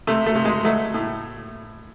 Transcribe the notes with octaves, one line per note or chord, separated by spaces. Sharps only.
C3 A3
A3
C3
G#3
F#3 A3
A2